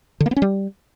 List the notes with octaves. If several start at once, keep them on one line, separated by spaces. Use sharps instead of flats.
D3
A#3
B3
C#4
G3